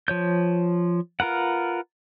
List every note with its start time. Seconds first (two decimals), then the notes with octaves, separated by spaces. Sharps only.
0.08 F3 C#5 G6
1.20 F4 A#4 B4 F#5